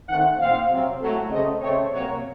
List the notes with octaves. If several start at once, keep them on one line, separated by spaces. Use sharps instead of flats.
D#3 A3 C4 F#5
A#2 F3 C4 F5
C3 F#3 C4
A2 F#3 A3
C#3 F#3 A3 C4 D#5
C#3 A3 C4 C#5
C3 F#3 A#3 C#5